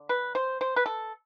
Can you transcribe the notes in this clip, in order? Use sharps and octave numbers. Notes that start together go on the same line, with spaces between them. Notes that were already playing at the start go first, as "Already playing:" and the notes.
Already playing: D3
B4
C5
C5
B4
A4